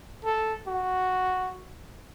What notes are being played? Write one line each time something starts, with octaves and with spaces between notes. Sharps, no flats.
A4
F#4